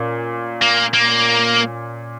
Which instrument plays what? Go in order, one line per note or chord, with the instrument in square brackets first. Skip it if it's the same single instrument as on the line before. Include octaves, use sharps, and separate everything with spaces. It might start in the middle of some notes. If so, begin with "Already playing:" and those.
Already playing: [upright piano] A#2 C#4
[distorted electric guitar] A#3
A#3